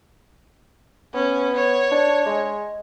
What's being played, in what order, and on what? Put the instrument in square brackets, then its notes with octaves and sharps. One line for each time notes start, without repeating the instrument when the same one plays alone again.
[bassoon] B3 [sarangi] C#4
[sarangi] C#5
[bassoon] D4
G#3